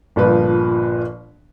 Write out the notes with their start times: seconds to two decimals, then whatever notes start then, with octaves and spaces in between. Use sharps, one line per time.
0.16 G1 A#2 F3 B4